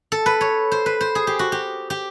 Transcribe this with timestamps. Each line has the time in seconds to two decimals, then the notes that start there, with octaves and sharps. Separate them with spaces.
0.12 A4
0.26 B4
0.41 C#5
0.72 C5
0.86 B4
1.01 C5
1.15 G#4
1.27 G4
1.39 F#4
1.52 G4
1.90 G4